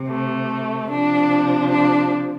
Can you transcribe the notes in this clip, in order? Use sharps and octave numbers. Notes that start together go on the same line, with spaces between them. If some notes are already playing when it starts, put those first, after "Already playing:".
Already playing: C3
A3
C3 F3 D4
D4